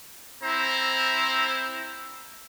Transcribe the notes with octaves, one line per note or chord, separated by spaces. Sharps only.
C4 E4 C5 A#5